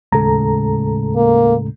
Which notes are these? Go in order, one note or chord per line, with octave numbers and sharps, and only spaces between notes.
D#2 A2 C#3 G#3 A4 A#5
A#3